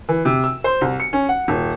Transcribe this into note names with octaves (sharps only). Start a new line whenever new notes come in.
E3
C3
E6
C5
C2
C#7
C#4
F#5
D#1